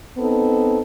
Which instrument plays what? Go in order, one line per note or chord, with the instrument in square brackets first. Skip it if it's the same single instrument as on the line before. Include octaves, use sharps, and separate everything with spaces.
[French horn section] B3 C4 D#4 A4